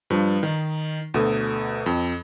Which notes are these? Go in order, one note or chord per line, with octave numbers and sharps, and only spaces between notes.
G2 F3
D#3
D2 B2 A4 D#6
F2